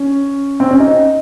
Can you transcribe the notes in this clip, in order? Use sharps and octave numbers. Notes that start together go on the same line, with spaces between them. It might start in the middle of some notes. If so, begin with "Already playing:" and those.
Already playing: C#4
C4
C#4
D#4